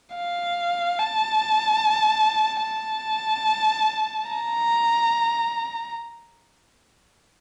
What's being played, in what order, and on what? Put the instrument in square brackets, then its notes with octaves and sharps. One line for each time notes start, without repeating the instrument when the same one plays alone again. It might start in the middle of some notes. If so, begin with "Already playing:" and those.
[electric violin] F5
A5
A5
A#5